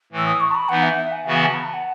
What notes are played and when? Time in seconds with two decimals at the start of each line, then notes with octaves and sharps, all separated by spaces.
0.12 A2 E3 A3
0.18 E6
0.26 D#6
0.40 C#6
0.51 A5
0.55 B5
0.69 E3 B3 D#4 F#5
0.83 E5
0.97 E5
1.12 G#5
1.25 C#3 E3 B3 F#4 E5
1.36 G#5
1.45 A5
1.54 B5
1.64 A5
1.74 F#5